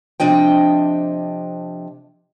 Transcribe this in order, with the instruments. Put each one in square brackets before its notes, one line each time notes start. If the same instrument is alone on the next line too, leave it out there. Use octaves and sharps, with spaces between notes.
[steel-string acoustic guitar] C3 F3 D4 D#5 G5